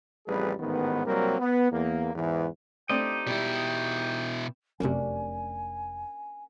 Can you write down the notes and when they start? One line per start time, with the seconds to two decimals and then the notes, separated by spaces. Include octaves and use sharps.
0.27 A1 F2 G3 G#4 B4
0.60 A1 G#2 D#3 E3 B3
1.05 C2 F#3 G3 A#3 C4 A#4
1.38 B3
1.71 E2 A#3
2.14 E2 G#2 E3
2.89 A3 C4 D4 D#4 G4 D#5 G5
3.27 B2 G3 E4
4.80 F1 F#2 C3 A3 A#3 C#4 D4 G#5